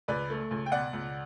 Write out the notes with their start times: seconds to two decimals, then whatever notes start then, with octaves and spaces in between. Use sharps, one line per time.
0.08 C#2 B4 D5
0.30 A3
0.51 C#2
0.66 G5
0.72 B2 D5 F#5
0.93 C#2